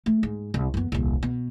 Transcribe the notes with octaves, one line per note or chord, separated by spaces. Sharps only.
A3
G#2
C2
F#2 B3
D#1 C2
B2